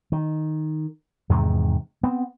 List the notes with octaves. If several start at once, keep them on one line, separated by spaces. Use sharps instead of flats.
D#3
E2 G#2 C3 D#3
B3 C4